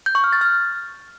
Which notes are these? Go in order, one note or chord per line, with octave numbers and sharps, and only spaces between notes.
G6
C#6
F6
A6
F6